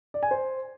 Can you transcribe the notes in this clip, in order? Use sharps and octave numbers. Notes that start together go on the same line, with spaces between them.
D5
G#5
C5